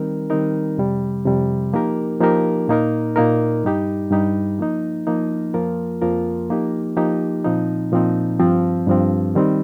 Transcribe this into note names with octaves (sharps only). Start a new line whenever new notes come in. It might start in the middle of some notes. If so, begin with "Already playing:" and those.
Already playing: D#3 G3 C4 D#4 A#4
D#3 G3 C4 D#4 A#4
F2 C3 G3
F2 C3 G3
F3 A#3 D#4 G4 A#4
F3 A#3 D#4 G4 A#4
A#2 A#3 D#4 A#4
A#2 A#3 D#4 A#4
G2 G3 D#4 G4
G2 G3 D#4 G4
F3 A#3 D#4
F3 A#3 D#4
F2 F3 A#3 F4 A#4
F2 F3 A#3 F4 A#4
F3 A#3 D#4 G4
F3 A#3 D#4 G4
A#2 F3 C4 D#4
A#2 F3 C4 D#4
G2 F3 C4
G2 F3 C4
D#3 G3 C4 D#4